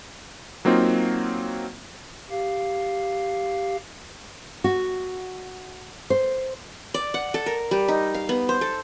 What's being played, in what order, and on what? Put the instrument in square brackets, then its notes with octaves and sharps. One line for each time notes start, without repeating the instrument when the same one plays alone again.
[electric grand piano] F#3 A#3 C4 D#4 F4
[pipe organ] G4 F5
[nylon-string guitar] F#4
C5
[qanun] D5
F#5
A4
A#4
G3
D#4
F5
B3
C5
A4